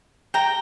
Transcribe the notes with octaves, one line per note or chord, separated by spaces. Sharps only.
G5 A#5